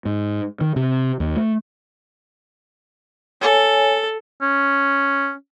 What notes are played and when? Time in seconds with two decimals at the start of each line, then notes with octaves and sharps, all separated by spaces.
0.05 G#2
0.61 D#3
0.76 C3
1.20 D#2
1.36 A3
3.42 A4 C#5 G#5
4.41 C#4